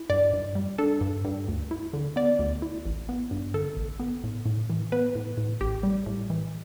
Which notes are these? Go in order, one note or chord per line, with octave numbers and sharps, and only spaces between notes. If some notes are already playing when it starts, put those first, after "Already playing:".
Already playing: E4
G2 D5
G2
G3
D4 A4
G2
G2
D2
E4
D3
B3 D5
D2
E4
A1
B3
G2
D3 A4
A1
B3
A2
A2
E3
B3 B4
A2
A2
A1 G4
G3
A2
E3